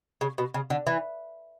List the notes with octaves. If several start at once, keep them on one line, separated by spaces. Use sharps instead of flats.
C#3
B2
C#3
D3
E3